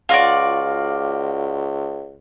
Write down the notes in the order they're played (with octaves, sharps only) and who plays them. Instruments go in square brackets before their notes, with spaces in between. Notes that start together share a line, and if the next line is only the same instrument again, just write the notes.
[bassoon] C#2 [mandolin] F4 F#4 D5